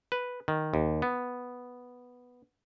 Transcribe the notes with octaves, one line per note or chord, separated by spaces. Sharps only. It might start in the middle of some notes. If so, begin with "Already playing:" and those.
B4
D#3
D#2
B3